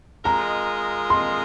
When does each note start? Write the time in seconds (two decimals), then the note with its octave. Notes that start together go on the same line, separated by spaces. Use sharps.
0.25 G#3 F4 A#4 D#5 A#5
1.10 C6